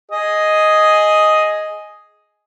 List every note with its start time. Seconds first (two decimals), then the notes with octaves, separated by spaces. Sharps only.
0.11 G#4 D#5